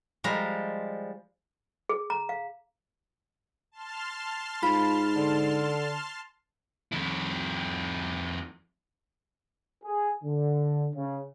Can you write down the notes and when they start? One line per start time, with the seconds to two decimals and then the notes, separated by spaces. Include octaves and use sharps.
0.24 F3 G3 G#3 A#5
1.89 G#4
2.10 A#5
2.29 F5
3.72 A5 C6 F6
4.63 G#2 F4 B5
5.16 D3
6.92 F2 E4
9.84 G#4
10.23 D3
10.95 C#3